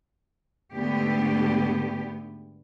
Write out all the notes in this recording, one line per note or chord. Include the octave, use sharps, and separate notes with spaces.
D2 G#2 D3 B3 G4